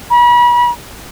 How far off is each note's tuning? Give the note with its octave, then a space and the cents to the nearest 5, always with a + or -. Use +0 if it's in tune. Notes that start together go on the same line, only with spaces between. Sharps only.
B5 -40